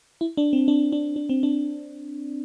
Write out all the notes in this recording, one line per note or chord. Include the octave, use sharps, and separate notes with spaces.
E4
D4
C4
D4
D4
D4
C4
D4